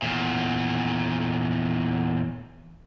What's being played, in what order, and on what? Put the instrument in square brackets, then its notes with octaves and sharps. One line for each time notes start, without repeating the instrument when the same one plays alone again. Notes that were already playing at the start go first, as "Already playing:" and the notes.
[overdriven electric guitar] E2 A#2